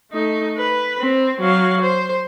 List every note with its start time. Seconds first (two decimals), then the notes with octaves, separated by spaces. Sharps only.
0.12 A3 D#4
0.57 B4
1.00 C4
1.40 F#3 F5
1.81 C5